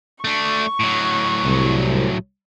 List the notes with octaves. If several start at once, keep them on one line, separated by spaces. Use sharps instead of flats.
A3 D4 C#6
A2 F#3
C2